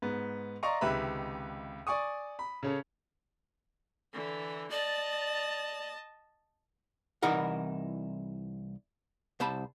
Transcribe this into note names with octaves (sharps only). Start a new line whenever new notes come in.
G#2 B3
D5 D#5 F5 A#5 C6 C#6
C#2 C3 D#3 B4 E5 B5
D5 G#5 C#6 D#6
B5
C#3 C#4 A4
D3 E3
D5 D#5 A5
C2 E3 D#4 E4 A#4 F#5
C2 C5 A5 B5